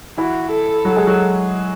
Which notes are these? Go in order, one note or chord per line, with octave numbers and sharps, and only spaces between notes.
E3 E4 F#4
A4
F#3 F#4
G#3 G#4
F#3 F#4